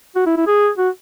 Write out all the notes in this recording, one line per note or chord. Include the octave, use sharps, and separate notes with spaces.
F#4
E4
E4
G#4
F#4